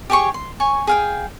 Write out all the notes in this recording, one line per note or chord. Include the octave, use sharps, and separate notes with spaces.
G4 G#4 C#5 C#6
C6
C#5 G#5 C#6
G#4 F5 G5